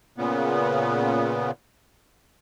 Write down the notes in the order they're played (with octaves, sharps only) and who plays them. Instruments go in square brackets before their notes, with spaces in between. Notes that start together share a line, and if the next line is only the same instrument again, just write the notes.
[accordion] A#2 C#3 B3